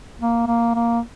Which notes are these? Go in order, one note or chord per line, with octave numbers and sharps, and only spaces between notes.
A#3
A#3
A#3